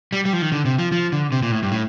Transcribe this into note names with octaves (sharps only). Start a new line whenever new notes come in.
G3
G3
F3
D#3
D3
C3
F3
F3
D3
C3
A#2
A2
G2
A2